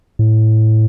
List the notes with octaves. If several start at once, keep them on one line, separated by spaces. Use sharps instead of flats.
A2